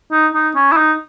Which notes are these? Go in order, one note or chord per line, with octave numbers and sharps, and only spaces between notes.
D#4
D#4
C#4
E4
D#4